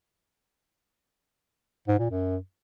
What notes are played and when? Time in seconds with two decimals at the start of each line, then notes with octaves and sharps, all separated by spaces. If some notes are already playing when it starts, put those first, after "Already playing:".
1.88 G#2
1.99 A#2
2.11 F#2